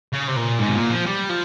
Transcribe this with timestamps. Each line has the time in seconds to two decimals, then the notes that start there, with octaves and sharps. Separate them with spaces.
0.13 C#3
0.28 C3
0.36 A#2
0.59 G#2
0.68 C3
0.75 A#2
0.90 F3
1.06 G3
1.29 F3